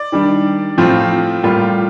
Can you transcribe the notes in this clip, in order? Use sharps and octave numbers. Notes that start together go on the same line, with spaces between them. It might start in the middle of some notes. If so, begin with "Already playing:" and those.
Already playing: D5
D#3 G3 D4
A2 F3 C4 F4
A2 G3 A#3 F4